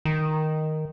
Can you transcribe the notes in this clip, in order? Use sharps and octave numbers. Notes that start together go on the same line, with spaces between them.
D#3